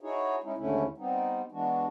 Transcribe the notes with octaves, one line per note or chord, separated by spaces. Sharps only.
D#4 E4 F#4 G#4 C#5
G#3 C#4 D#4 E4
D#2 G#2 D3 A3 C#4 E4
G3 B3 C4 D#4
E3 G#3 B3 D4 F#4